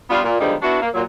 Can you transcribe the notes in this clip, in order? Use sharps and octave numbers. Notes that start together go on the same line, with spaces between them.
G3 B3 D4 F4
A#2
D3 D#3 F3 G3 G#3 B3
B3 D4 E4 F#4
A#3
A#2 F#3